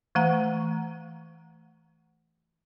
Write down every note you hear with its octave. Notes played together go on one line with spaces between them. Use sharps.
E3 A3 F#5 A#5